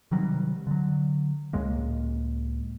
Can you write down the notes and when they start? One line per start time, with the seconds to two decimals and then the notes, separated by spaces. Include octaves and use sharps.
0.11 C3 D#3 F#3 G3
0.67 D3 F#3
1.53 C#2 A2 G#3 A#3